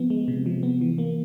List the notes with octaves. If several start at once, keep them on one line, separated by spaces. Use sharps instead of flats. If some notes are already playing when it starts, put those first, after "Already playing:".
Already playing: F3 B3
G#3
C3
F3
B3
E3
A#3